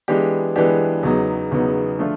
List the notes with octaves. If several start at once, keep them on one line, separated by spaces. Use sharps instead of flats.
E3 G#3 B3 D4 G4
E3 G#3 B3 D4 G4
E2 C#3 F#3 B3 D#4
E2 C#3 F#3 B3 D#4
D3 F3 A3 D4 F4